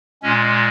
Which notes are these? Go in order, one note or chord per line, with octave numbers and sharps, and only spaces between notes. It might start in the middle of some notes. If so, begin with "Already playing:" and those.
A#2 G#3 C#4